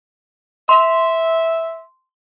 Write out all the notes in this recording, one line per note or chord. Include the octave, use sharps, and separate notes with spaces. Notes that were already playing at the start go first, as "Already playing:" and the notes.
E5 C6